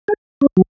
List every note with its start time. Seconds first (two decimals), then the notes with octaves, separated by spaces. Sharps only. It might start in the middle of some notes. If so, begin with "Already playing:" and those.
0.08 G#4
0.41 C#4
0.57 F#3